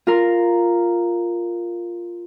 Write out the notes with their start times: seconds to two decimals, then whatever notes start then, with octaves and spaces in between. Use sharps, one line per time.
0.07 F4 A#4